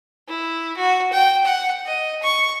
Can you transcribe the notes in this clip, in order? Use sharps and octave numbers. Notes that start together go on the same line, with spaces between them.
E4
F#4
G5
F#5
D#5
C#6